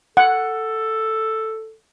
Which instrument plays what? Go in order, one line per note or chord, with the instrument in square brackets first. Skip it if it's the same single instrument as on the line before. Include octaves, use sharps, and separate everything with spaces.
[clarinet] A4 [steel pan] F#5